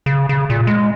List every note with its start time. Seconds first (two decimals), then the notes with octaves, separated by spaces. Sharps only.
0.06 C#3
0.29 C#3
0.50 A#2
0.67 G#3